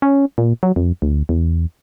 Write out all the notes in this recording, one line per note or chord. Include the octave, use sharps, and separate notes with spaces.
C#4
A#2
F#3
F2
D2
E2